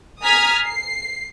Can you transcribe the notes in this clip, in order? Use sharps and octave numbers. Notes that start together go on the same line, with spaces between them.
G#5 A#5 D#6 F6 G#6 B6
C7